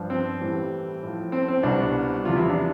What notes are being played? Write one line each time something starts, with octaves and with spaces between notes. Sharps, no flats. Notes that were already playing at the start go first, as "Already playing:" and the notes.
Already playing: G2 F3
C4
A2 E3 G3
A2 F3
C4
C4
C2 B2 G3 D4
E2 C3 F3 F4
E4
D4